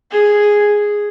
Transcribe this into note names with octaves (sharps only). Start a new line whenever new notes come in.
G#4